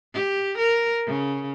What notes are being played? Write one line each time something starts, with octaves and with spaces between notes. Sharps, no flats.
G4
A#4
C#3